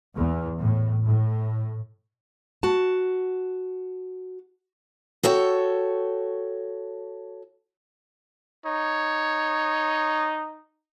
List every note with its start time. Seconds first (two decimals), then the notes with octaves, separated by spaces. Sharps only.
0.16 E2
0.61 A2
1.06 A2
2.63 F#4 A5
5.23 F#4 A4 C#5 G5
8.66 D#4 C#5